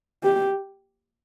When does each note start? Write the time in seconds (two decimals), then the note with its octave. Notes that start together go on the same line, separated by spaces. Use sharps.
0.23 G4